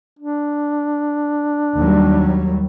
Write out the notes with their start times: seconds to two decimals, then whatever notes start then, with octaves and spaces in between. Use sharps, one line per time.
0.19 D4
1.77 D#2 F#3 G3